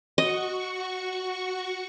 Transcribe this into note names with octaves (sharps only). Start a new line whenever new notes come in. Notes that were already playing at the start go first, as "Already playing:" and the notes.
F#4 D#5 C#6